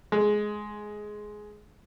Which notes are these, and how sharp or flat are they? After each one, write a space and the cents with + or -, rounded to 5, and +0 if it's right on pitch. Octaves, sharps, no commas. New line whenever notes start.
G#3 +10